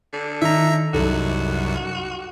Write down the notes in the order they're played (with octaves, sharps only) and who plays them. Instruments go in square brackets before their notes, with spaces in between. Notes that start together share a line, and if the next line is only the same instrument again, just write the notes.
[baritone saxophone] D3
[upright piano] D#3 [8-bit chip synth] E5 A#5
[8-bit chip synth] C2 F#2 [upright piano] D#4 A4 [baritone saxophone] F#4